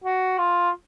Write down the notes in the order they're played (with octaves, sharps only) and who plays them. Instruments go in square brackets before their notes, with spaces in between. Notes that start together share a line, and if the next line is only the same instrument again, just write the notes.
[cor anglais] F#4
F4